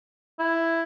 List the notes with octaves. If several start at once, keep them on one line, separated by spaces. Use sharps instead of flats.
E4